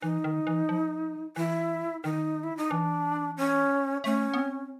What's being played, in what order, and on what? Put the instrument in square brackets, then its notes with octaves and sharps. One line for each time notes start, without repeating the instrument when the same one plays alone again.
[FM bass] E3 [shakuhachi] D#4
[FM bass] D#3
E3
F3
[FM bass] E3 [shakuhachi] E4
[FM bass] D#3 [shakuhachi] D#4
[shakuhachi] E4
D#4
[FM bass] E3 [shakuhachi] D4
[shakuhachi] C#4
[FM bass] A3 [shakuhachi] C#4
[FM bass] B3
C4